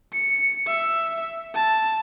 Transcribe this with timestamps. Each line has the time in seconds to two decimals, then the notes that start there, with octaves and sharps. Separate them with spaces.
0.13 C#7
0.66 E5
1.54 A5